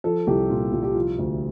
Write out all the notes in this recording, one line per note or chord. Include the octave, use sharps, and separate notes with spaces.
F3 A4
C2 G4
A#2 F4
C2 F4
G4
F3 F4
D2